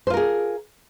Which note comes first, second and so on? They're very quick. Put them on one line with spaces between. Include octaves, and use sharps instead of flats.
C5 F4 A#4 G#4